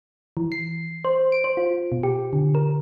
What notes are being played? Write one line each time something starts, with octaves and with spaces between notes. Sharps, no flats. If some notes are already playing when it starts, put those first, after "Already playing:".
E3
C7
C5
D7
C5
F4
B2
G4
D3
A#4